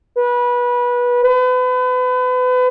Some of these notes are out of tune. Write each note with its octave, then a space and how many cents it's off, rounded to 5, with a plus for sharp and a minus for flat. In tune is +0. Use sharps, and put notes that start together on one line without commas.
B4 -20
B4 +35